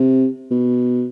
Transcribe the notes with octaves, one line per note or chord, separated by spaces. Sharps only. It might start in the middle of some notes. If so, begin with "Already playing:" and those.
Already playing: C3
B2